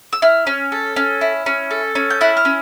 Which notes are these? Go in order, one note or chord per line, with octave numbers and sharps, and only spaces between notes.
E6
E4 F6
C#4
A4
C#4
E4
C#4
A4
C#4
G6
E4 F#6
F6
C#4